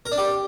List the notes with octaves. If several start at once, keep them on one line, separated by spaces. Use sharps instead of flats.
A#4
D4
G4